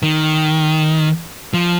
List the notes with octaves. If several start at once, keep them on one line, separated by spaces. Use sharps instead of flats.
D#3
F3